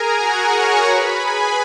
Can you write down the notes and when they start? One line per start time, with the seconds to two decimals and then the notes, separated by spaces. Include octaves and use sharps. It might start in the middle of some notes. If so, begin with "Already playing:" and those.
Already playing: G#4 A#4 G#5 A#5
0.17 F#4 F#5
0.51 C#5 C#6
0.86 B4 B5
1.20 G#4 G#5